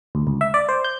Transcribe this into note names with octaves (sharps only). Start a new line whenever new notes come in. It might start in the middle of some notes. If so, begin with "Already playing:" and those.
D2
C#2
E5
D5
C5
G6